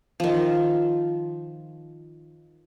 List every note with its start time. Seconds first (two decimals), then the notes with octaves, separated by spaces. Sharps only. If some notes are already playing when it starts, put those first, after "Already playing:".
0.20 D#3 F3